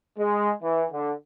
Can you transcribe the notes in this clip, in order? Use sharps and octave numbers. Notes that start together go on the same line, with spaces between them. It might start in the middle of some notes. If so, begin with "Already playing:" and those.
G#3
E3
D3